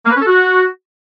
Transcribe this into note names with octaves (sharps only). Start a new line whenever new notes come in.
A#3
B4
C#4
A4
F#4